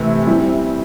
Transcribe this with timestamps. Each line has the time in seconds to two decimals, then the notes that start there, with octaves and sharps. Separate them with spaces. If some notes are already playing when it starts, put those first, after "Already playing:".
Already playing: C3 E3 A3 C4 E4
0.27 G3 C4 E4